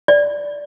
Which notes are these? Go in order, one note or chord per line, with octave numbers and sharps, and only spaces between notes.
D5